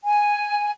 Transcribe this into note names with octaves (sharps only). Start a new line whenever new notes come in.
G#5